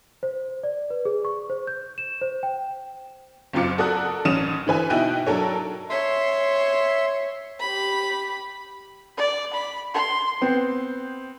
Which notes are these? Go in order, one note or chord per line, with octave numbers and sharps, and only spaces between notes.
C5
D5
B4
G#4
C#6
C5
G6
E7
C5
G5
F#1 F#2 C4 F4 D6 C#7
F#4 A4 A#4 D5 D#6 F#6
A1 C#4 D#6 F6 D#7 E7
D3 E3 B4 G#5
B2 D#4 E4 G5 F#6 D#7
F#3 D4 A4 A#4 C#5
C#5 E5 C6
G4 B5
D5
B5
C6
B3 C4